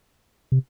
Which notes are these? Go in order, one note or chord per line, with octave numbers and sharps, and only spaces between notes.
C3